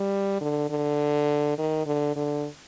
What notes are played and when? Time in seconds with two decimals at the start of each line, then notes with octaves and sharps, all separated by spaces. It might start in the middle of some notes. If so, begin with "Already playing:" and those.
Already playing: G3
0.41 D3
0.70 D3
1.58 D#3
1.86 D3
2.16 D3